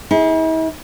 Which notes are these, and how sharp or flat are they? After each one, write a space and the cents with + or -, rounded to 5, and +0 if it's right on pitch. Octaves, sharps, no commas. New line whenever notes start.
E4 -45 G#4 -5